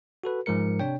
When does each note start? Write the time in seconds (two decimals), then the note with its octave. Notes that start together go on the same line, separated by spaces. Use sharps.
0.24 F#4 A4 B4
0.46 G#2 F3 G#3 A#4 C#7
0.80 C3 D4 C#5 G5